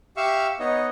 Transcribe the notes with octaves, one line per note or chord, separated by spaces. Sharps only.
G4 E5 F5 C#6 E6
B3 D#4 C#5 D#5